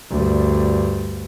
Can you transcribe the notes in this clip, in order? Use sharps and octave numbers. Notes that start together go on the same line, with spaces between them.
D2 G2